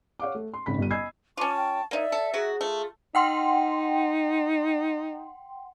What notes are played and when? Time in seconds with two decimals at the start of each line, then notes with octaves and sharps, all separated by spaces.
0.20 C#5 F5 F#5 D6
0.35 A3
0.54 C6
0.66 G#1 C#3 B5 B6
0.78 G1 G3 D#7
0.91 D#5 G#5 B5 E6 G#6 C7
1.37 C#4 F4 C#5 A5 C#6 D6
1.56 G5
1.91 A#3 D#4 D5 E5
2.12 A4
2.34 F#3 F#4 G#4
2.61 A3 F4
3.15 D#4 F#5 G5 C6